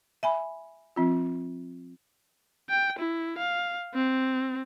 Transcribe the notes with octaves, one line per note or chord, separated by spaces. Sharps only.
E5 G#5 B5
F3 C4 F4
G5
E4
F5
C4